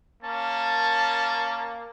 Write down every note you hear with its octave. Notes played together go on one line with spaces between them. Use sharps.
A#3 C#4 A5